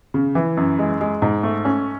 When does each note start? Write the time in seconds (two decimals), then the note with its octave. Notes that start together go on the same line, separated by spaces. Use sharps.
0.14 C#3
0.35 E3
0.57 F#2
0.79 G#3
1.01 G#3
1.22 G#2
1.43 A3
1.65 C#4